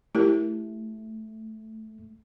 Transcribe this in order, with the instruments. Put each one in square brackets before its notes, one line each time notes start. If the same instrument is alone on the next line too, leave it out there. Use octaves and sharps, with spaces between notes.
[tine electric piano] A3 [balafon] E4 G4 A#4